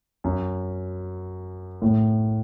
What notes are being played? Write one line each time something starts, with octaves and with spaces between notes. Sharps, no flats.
F#2
A2